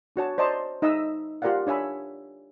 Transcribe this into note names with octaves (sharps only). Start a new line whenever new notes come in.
D4 F#4 C#5 A5
C5 D5 D#5 A5 A#5 C6
D#4 D#5 E5 A#5 E6
F4 G4 A#4 D5 F5 F#5
D4 C#5 E5 G#5 B5